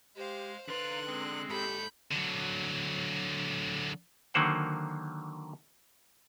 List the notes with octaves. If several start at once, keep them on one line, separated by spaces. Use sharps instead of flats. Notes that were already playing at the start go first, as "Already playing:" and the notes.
G#3 G4 C5 F5
D3 B4 D5 F5 A#5 C6 F#6
G#3 C4 G#4
G#2 G4 A4 B5 G6
D3 F#3
D3 D#3 F#3 A#3 C5 F#5